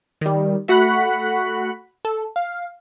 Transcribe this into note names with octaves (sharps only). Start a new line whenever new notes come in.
D#3 G3
A3 F#4 F#5 B5 F#6
A4
F5